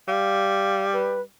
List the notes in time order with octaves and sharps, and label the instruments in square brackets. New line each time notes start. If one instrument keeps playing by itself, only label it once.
[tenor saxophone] G3 [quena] F5
[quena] B4